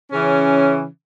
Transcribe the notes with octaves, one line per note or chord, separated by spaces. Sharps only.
C#3 E3 C#4